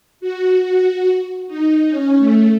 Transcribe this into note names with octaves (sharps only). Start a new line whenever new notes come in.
F#4
F#4
D#4
C#4
A3